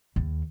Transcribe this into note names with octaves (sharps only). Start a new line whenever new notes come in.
D#2